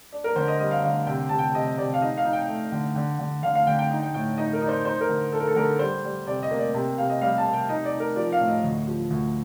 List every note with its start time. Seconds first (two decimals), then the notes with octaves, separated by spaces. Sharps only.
0.12 D4
0.24 A#4
0.36 D3 C5
0.48 D#5
0.60 G3 D#5
0.71 F5
0.83 D3 F5
1.07 C3 G5
1.29 C3 A5
1.39 G5
1.54 C3 D#5
1.78 C3 D5
1.94 F5
2.01 D#4 D#5
2.17 F5
2.25 D#4
2.33 G5
2.49 A3
2.72 D3
2.96 D3
3.19 D3
3.43 D3 F5
3.55 F5
3.67 D3 G5
3.79 G5
3.91 D#4
4.03 G5
4.14 A2 G5
4.38 D#4 D#5
4.53 A#4
4.62 D#4 D5
4.69 C5
4.85 D#4 C5
5.01 A#4
5.09 D3
5.32 D#4 A4
5.40 A#4
5.48 A4
5.56 D3 A#4
5.79 G3 C5
6.04 G3
6.27 C3 D5
6.43 D#5
6.51 A#3
6.59 D5
6.74 C3
6.98 C3 F5
7.10 D#5
7.21 G3 F5
7.38 A5
7.45 C3
7.53 G5
7.69 D#4 D#5
7.85 D5
7.93 D#4
8.00 A#4
8.16 F3 D5
8.32 F5
8.40 A2
8.48 D#5
8.64 D2
8.88 F3
9.11 D2